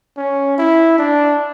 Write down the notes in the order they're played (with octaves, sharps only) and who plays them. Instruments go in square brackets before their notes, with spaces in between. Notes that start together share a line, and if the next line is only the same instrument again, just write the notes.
[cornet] C#4
E4
D4